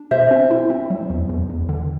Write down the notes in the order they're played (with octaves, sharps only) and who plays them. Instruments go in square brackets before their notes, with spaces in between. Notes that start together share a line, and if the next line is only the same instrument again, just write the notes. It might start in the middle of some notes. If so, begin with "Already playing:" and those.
Already playing: [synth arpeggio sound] D4
[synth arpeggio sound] B2 [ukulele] C5 E5
[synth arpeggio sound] C4
E4
C4
F#3
E2
E2
E2
D3